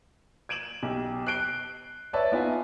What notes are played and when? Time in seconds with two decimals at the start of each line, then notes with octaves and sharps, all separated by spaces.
0.49 G#6 D7 E7 F#7
0.83 B1 G4
1.27 F#6 C7 D7 G7
2.13 B4 C#5 D5 E5 A5
2.32 B3 D#4 F4 B4 D#5 G#5